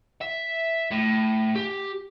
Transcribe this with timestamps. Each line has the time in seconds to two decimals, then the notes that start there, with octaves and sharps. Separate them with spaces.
0.21 E5
0.91 A2
1.56 G4